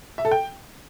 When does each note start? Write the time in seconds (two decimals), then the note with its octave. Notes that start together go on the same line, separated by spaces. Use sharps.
0.18 E5
0.25 A4
0.31 G5